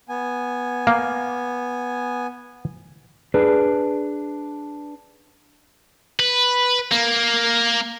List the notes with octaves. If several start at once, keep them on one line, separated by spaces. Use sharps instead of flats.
B3 G#5
A#3
D4 G#4 B4
B4
A#3